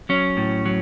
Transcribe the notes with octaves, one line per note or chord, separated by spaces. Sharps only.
F#3 C#4
A2
F#3